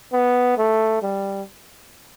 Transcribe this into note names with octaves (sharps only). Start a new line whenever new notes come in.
B3
A3
G3